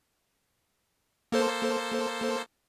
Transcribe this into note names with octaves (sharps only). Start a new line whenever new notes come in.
A#3 A4 C5